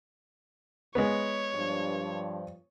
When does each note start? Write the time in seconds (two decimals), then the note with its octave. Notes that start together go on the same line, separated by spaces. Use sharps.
0.95 G#3 B3 C#5
1.54 G2 F3